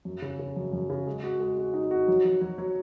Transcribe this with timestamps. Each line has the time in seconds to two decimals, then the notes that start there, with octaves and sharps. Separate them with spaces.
0.05 F#2
0.22 C#3
0.39 C#3
0.56 F#2
0.73 F#2
0.90 C#3
1.07 G#3
1.23 F#4
1.40 G#3
1.57 F#4
1.74 D#4
1.91 F#4
2.08 F#3
2.25 F#3
2.41 F#3
2.58 F#3